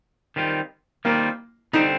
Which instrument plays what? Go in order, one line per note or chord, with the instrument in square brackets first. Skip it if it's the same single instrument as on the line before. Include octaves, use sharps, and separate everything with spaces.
[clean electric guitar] D#3 G3 C4 F4
[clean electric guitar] D#3 G3 C4 F4 [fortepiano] A#3
[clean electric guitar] D3 G3 C4 [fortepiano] D#4